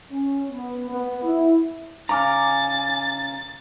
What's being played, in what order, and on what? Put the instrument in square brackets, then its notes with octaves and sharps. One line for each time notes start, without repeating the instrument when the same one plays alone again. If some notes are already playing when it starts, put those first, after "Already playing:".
[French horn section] C#4
B3
B3
E4
[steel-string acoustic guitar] C#3 [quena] G#5 [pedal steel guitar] A#5 D6 F6 [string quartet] A6